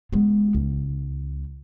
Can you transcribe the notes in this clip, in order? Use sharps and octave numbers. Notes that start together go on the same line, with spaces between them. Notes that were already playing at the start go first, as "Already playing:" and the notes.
G#3 B3
C#2